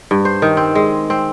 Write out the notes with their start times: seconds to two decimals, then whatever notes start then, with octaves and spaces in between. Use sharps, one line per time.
0.11 G2
0.25 C5
0.42 D#3
0.57 C4
0.75 G#3
1.10 C4